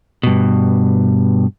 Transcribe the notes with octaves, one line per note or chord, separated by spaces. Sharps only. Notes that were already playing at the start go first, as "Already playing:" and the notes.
G2 B2